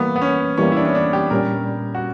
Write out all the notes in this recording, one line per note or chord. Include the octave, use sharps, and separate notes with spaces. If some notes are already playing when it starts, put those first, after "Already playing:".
Already playing: E3 G3 A#3 B3
B3
C#4
E3 G3 A#3 C#4
E4
D4
C#4
D4
G4
A#2 G3 C#4 A#4
F#4